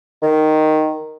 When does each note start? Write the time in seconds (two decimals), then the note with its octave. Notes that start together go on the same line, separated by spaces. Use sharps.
0.23 D#3